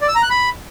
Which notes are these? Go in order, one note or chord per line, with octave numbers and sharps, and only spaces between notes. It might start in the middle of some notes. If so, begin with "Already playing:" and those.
D5
E6
A#5
F#6
B5